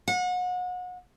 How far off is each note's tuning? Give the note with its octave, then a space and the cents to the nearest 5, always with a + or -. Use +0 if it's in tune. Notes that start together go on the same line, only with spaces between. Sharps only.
F#5 -35